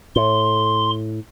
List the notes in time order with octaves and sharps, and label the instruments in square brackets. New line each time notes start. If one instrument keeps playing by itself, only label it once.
[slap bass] A2 [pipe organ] C6